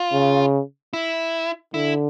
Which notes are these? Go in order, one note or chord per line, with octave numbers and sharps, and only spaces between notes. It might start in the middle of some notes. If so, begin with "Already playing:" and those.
Already playing: F4
C#3
E4
D3 E4